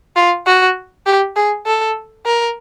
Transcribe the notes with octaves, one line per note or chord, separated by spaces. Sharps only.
F4
F#4
G4
G#4
A4
A#4